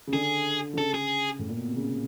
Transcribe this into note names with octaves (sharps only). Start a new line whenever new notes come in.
C#3
D3 G#4
D3
C#3 A4
G#4
A2
A#2
B2
C3
C#3